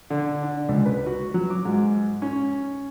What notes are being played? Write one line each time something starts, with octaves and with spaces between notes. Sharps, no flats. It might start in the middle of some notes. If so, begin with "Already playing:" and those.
D3
D4
C#2
B4
F#4
F#3
D6
G#2
C#4